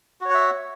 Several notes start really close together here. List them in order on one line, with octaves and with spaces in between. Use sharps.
F#4 C#5 F#5 E5